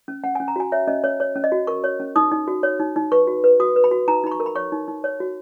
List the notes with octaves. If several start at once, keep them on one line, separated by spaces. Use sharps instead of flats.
C#4
C#4 F#5
G#5
C#4
A#5
F#4 G#5
C#5 E5
C#4 D#5
C#4 C#5
C#5
C#4
D#5
F#4
A#4 C#6
C#5
C#4
D#4 D#6
D#4
F#4
C#5
D#4
D#4
B4 C#6
F#4
B4
F#4 D#6
B4
B5
F#4
D#4 A#5
D#4 B5
C#6
A#4
B5
C#5 C#6
D#4
D#4
C#5
F#4